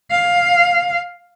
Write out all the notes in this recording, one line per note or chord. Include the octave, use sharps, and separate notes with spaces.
F5